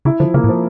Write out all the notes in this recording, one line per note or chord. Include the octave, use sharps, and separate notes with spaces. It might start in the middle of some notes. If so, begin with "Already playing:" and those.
C#3 E4
D3 F3
C#3 A#3
A2
F3